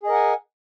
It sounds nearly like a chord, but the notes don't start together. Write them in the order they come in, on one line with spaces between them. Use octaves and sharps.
G#4 D#5 A#4 F#5 G#5